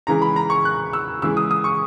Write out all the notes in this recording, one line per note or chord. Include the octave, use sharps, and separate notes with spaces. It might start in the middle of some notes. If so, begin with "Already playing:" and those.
C#3 E3 G#3 A#5
B5
A#5
C#6
F#6
E6
C#3 E3 G#3 E6
D#6
D#6
C#6